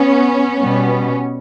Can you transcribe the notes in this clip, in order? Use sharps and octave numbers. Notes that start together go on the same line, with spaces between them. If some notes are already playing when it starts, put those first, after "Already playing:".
Already playing: B3 C#4
B2 G3 B3